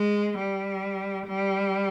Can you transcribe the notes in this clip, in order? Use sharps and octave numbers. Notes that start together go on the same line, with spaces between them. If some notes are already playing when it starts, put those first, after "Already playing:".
Already playing: G#3
G3
G3